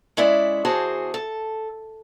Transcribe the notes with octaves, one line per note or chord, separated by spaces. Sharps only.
G#3 C#4 E4 D5 E5
E2 F#4 G#4 C5 A5
A4